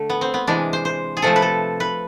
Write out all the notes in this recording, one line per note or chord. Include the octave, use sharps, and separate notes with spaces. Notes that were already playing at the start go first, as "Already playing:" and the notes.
Already playing: D3 A3
B3
C4
B3
C3 E3 G#3 D4
C5
C5
G#4
C3 F3 A3 A4
B4
A4
B4